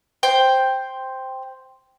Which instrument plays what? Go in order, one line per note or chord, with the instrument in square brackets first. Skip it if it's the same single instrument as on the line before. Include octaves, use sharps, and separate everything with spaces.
[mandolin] C5 G5 C6